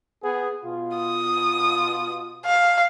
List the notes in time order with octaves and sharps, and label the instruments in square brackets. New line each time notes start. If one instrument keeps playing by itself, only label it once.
[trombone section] B3 G#4
B2 F4
[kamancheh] D#6
[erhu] F5